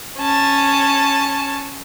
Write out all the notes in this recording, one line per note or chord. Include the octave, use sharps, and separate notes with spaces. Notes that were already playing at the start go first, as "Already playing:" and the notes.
C#4 A5